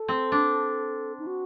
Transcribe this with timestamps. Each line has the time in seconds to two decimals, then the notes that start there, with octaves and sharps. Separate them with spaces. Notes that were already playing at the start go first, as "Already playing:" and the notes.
Already playing: A4
0.08 C4
0.32 D4
1.19 D#4
1.26 F#4